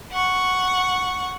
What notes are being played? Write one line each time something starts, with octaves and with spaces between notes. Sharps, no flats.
F#5 C#6